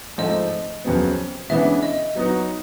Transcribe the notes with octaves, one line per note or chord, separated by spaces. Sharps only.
G#2 F3 A3 C4 D#5
F2 C#3 F#3 B3
C#3 E3 G#3 B3 D4 E5
D#5
F#3 B3 D#4 F#4